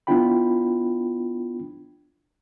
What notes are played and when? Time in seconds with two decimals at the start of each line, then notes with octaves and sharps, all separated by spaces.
0.07 B3 D4 E4 F4 G5 B5